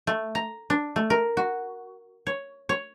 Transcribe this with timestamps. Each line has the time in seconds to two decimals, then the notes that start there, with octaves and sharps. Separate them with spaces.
0.07 A3
0.35 A#5
0.70 D4
0.96 A3
1.10 A#4
1.37 F#4
2.27 C#5
2.69 C#5